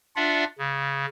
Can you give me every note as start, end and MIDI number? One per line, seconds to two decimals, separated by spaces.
0.16 0.44 62
0.16 0.44 65
0.16 0.44 74
0.16 0.44 76
0.16 0.44 78
0.58 1.06 49